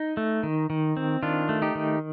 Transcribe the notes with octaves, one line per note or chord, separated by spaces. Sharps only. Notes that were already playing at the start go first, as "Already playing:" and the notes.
Already playing: D#4
A3
D#3
D#3
C4
D#3 D4 F4
A3
D#4 G4
D#3